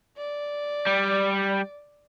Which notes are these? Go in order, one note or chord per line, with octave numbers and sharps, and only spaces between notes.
D5
G3